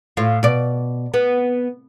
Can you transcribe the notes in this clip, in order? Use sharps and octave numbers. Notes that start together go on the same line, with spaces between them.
A2 F4
B2 D5
B3